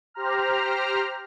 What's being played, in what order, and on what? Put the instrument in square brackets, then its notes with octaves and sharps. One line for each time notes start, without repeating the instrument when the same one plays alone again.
[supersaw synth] G4 C5 A#5 F6